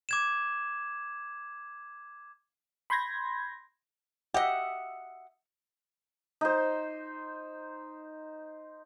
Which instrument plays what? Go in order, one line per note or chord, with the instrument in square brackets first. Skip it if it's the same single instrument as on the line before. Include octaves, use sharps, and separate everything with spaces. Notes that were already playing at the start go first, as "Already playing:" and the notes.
[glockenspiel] D6 G#6 E7
[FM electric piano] B5 C6 G6 G#6 A#6
[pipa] G4 D#5 [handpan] E5 F#5
[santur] D#4 C5